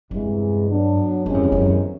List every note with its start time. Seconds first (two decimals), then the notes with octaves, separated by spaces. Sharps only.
0.11 E2 G2 C3 E3 G#3
0.68 F#3 B3 D4
1.26 E2 G2 C3 D#3 G#3 C#4
1.34 F#2
1.43 F2
1.52 F#2